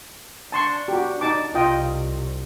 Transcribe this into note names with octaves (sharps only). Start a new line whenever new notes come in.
D4 A5 C6 C#6
F#4 G4
D#4 A5 D6
C2 F4 D#5 G5